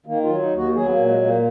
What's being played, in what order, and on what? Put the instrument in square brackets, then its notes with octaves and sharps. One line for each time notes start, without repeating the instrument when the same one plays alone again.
[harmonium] D#3 A#3
F4
F#3
D#4
D#2
F#4
F#3 G#4
B3
A#3
A#2
G#3
A#2 G#3
A#3